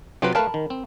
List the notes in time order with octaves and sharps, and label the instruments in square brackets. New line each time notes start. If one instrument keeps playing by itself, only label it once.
[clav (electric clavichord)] C3 F#3 C4 [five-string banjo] F4 G4 B4
[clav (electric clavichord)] A3 B4 F5 [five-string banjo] A#4 A5 B5
[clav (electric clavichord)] D#3
C4